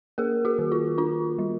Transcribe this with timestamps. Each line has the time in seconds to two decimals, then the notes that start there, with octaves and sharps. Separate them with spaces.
0.18 A#3 G#4 A#4
0.45 F#4 G#4
0.59 D#3
0.72 F4
0.98 D4 F4
1.38 G3